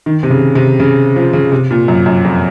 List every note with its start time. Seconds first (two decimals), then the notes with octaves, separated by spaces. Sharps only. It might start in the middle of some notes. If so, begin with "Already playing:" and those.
0.06 D#3
0.23 C3
0.30 C#3
0.55 C3
0.80 C#3
1.16 F3
1.33 C#3
1.52 C3
1.71 A#2
1.88 F#2
2.06 F#2
2.25 F2